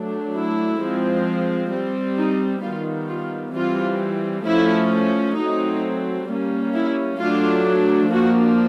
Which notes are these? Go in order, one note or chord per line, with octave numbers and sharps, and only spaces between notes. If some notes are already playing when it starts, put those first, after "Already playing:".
Already playing: F#3 A3 D4
E4
F3 G#3 C4
G3 C4
D#4
D#3 G3 B3 F4
F4
E3 G3 C4 F4
F3 A3 C#4 E4
F#3 A3 C4 D#4
G3 A#3 C#4
E4
F#3 A3 D4 F4
F3 A#3 D4 F#4